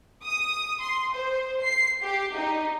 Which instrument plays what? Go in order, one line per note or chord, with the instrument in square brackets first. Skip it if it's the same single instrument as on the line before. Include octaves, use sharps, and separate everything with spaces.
[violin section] D#6
C6
C5
C7
G4
D#4